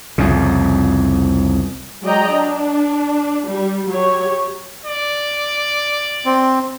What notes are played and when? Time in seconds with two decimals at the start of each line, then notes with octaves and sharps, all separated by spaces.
0.18 C2 F2 C#3
2.03 F#3 G#3 D5 D#5 G5 A#5
2.31 D4
3.48 G3
3.91 F#3 G4 C#5
4.86 D5
6.26 C4